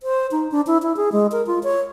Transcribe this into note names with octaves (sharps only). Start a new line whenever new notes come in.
C5
D#4
D4
E4
E4
G#4
G#3
A#4
F4
C#5